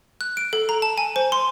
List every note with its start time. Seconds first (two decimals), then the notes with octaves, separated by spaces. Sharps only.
0.21 F#6
0.37 D7
0.53 A4
0.69 A#5
0.82 A5
0.98 G#5
1.16 C5
1.32 C6